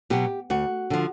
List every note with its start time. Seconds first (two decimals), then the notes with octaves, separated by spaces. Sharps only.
0.10 B2 F#3 G4
0.50 D2 F#4
0.90 D3 F3